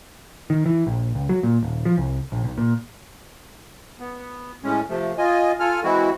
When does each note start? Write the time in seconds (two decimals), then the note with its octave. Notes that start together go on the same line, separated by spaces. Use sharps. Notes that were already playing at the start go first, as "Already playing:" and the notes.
0.50 D#3
0.66 E3
0.87 A#1
1.15 C#2
1.29 F#3
1.43 A#2
1.63 D#1
1.85 F3
1.98 C2
2.32 A#1
2.44 B1
2.58 A#2
4.00 B3
4.64 A2 G#3 C#4
4.89 C3 F3 A3
5.18 F4 D#5 G#5
5.60 F4 A4 G#5 F6
5.84 E3 G#3 C4 E4 F#4